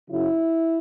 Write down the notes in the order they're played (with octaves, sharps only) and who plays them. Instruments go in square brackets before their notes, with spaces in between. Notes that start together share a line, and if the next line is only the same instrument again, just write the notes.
[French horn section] F#2 C#3 F#3 E4